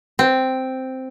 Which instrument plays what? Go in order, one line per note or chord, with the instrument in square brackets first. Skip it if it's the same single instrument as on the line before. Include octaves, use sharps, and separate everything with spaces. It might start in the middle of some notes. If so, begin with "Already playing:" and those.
[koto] C4